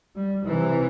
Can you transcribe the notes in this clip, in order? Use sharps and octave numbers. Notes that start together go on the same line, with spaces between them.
G3
C3 E3